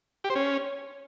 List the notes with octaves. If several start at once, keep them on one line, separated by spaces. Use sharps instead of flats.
G4
C5
C#4